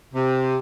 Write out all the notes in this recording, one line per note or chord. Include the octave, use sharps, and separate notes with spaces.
C3